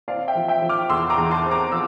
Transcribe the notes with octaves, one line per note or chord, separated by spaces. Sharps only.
C4 D5 F5
E5 G5
F3
E5 G5
F3
D6 F6
E2 C6 E6
A#5 D6
E2
A5 C6
C4
A#5 D6
F3 E6